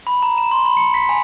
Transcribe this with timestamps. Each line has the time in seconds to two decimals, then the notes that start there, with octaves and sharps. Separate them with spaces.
0.07 B5
0.23 A#5
0.38 E7
0.52 C6
0.65 B5
0.77 C#7
0.94 B6
1.09 G#5